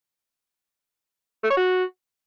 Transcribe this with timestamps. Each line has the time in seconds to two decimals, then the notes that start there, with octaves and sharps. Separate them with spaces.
1.44 A3
1.50 C#5
1.57 F#4